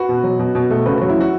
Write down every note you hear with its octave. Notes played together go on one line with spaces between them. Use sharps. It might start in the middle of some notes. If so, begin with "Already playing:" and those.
Already playing: F#4 B4
B2
F#3
B2
B2
A3
C#3 F#4 B4
F#3 F#4
E4
F#4